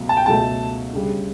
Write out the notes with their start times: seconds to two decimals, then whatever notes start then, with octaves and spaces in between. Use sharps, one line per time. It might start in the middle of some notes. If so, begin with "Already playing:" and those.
Already playing: C#2 B2 F#3 A3
0.09 A5
0.17 G5
0.26 C#2 B2 F#3 A3 A5
0.93 D2 C#3 G3